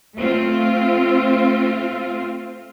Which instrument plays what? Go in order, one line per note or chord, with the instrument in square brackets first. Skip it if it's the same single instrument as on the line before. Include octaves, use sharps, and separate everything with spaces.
[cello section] A3 C4 F4